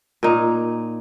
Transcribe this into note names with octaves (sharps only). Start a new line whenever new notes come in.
A#2 D#4